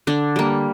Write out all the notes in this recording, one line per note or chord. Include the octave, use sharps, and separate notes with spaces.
D3 D4
G3 A#3